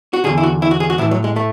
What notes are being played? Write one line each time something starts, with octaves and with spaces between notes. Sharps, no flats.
F#4
E2 D3 G#4
E4
F#4
E4
F#4
G#4
F#4
A2 E3 E4
F#3
G#3
A3